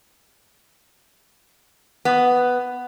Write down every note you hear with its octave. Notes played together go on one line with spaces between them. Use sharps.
B3